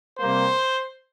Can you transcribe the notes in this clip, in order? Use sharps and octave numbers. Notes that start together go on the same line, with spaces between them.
C3 G3 A#3 C5